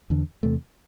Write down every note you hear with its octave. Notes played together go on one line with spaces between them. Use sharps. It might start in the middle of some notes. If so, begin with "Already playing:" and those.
E2 D3
E2 C3 A3